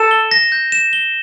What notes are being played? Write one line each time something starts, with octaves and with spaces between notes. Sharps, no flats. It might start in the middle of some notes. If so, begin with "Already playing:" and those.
Already playing: A4 E7
G7
A#6
G6
E7
G7